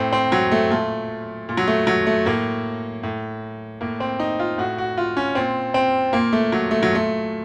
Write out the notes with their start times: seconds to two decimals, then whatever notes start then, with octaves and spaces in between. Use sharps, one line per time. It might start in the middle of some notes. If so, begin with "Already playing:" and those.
Already playing: A2 C4
0.13 C4
0.32 F#3
0.52 A3
0.71 A#2 A3
1.49 A#2
1.57 F#3
1.68 A3
1.87 F#3
2.07 A3
2.26 A2 A#3
3.03 A2
3.81 A2 A#3
4.00 C4
4.20 D#4
4.39 F4
4.58 A2 F#4
4.78 F#4
4.98 F4
5.17 C#4
5.35 A#2 C4
5.74 C4
6.13 A#2 A#3
6.33 A3
6.52 F#3
6.71 A3
6.83 F#3
6.91 A#2 A3